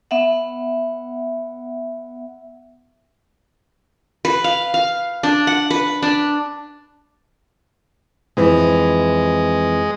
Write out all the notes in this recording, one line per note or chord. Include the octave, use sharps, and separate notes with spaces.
B3 E5 F#5
B4
F5
F5
D4
F#5
B4
D4
F2 E3 G#3